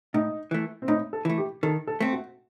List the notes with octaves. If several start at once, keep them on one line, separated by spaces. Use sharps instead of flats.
A2 D#4
E3 A3
C4
A2 D#4
A4
E3 A3
G4
D#3 A4
A4
A3 C4
F#4